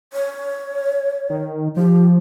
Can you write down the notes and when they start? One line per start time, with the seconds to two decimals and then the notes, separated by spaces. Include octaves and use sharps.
0.13 C#5
1.30 D#3
1.77 F3 G4